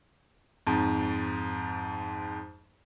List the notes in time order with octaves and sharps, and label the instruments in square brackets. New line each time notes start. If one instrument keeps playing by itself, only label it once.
[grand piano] F2 G#2